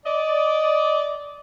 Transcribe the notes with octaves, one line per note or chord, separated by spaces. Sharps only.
D5 D#5